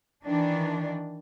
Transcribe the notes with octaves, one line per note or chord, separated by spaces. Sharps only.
D#3 E3 D4